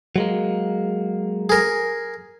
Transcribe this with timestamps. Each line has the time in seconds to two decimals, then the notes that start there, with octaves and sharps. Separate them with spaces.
0.16 F#3 G#3 A#3
1.49 G#4 A#4